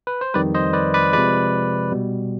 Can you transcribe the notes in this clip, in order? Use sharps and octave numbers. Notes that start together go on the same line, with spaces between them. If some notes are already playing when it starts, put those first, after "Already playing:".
B4
C5
F2 D#3 G3 B4 D5
C5 D#5
B4 D5
B4 D5
C3 F3 G#3 B4 D5
B2 G3